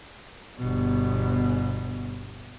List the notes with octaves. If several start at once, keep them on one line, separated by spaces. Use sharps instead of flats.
G1 B2